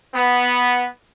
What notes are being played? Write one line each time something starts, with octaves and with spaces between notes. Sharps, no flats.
B3